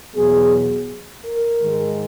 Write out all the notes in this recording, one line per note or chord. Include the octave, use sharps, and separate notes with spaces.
E2 B2 F#3 B3 G#4
A#4
G#2 D#3 G#3